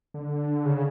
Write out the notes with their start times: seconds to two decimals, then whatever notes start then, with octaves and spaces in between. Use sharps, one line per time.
0.14 D3
0.65 C#3